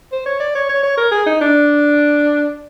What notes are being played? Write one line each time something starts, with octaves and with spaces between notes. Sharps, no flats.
C5
C#5
D5
C#5
C#5
C#5
A#4
G#4
D#4
D4